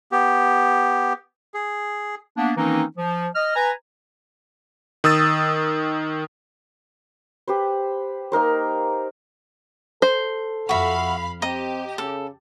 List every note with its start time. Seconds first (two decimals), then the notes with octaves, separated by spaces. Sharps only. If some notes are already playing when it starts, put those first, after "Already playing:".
0.12 B3 G4
1.54 G#4
2.37 A#3 B3 D4
2.57 D#3 E3 A#3 C4 C#4 D#4
2.97 F3
3.35 D#5 F6
3.56 B4 G#5 A#5
5.04 D#3 D#6 E6 A6
7.48 G4 B4 C5
8.32 A#3 D#4 A#4 C5
10.02 A4 C5
10.69 F2 F#4 E5 F5 B5
11.42 C4 G4 D#5 A#5
11.98 C#3 A4